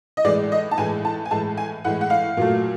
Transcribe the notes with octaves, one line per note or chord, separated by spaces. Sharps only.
D#5
A2 E3 G#3 D5
D#5
A5
A2 E3 G#3 G#5
A5
G#5
A2 E3 G#3 A5
G#5
A2 E3 G#3 F#5
F#5
F5
A#2 F#3 A3